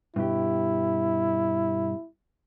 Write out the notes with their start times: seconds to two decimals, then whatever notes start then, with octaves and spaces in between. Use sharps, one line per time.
0.16 G2 B2 E4 G4